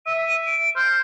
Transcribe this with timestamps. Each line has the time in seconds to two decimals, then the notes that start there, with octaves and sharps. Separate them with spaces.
0.06 E5 D#7
0.46 D7
0.76 C5 F6